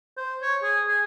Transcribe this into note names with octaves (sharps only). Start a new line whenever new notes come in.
C5
C#5
G#4
G#4